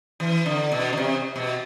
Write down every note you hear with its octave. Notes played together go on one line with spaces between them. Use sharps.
E3
D3
B2
D3
C3
B2